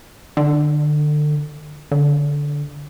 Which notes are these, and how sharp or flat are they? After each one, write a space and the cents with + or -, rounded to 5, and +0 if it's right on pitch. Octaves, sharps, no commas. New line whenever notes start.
D3 +30
D3 -10